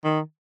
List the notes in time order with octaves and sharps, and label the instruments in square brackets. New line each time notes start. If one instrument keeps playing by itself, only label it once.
[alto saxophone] D#3